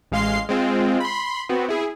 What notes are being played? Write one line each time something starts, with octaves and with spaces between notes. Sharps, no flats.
A1 G#3 F5 C6 C7
G#3 C4 F4
B5 C6
B3 C4 F#4
E4 G#4